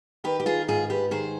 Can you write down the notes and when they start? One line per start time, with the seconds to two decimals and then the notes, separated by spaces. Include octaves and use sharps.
0.24 D#3 G4 B4
0.40 G4
0.46 F4 G#4
0.68 G#2 F4 G#4
0.90 G4 B4
1.11 D#3 G#4 C5